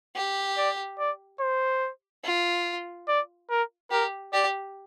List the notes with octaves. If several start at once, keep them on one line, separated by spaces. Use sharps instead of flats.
G4
D5
D5
C5
F4
D5
A#4
G4 A#4
G4 D5